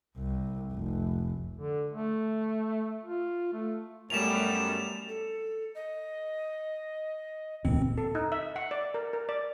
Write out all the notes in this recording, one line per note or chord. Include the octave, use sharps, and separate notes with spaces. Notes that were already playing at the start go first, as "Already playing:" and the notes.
C2
F1
D3
A3
F4
A3
F#2 G3 A3 B3 E7 F7
A4
D#5
E1 D2 A#2 C4
A4
D#4
E5
F#5
D5
A#4
A#4
D5